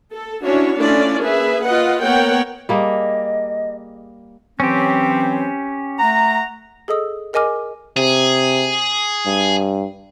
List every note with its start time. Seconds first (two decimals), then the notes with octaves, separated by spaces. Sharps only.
0.13 A4
0.43 C#4 D4 E4 F#4 C#5
0.77 A3 C#4 D4 E4 F4 D5
1.21 A#3 G#4 B4 E5
1.66 F4 B4 D#5 F#5
2.03 A#3 B3 A#4 C#5 F#5 G5
2.69 G3 A#3 G#4 D#5
4.60 E3 F#3 C4 C#4 G4
5.99 A3 F#5 A#5
6.88 G#4 A4 D#5 D#6 E6
7.33 G#4 A#4 D#5 G#5 D6 F6
7.97 C3 G#4
9.26 G2